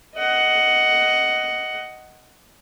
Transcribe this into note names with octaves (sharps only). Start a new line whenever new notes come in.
D#5 F#5